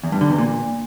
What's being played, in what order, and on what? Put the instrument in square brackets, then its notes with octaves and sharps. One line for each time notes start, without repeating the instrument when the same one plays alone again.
[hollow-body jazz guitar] E2
G2
D3
E2
A#2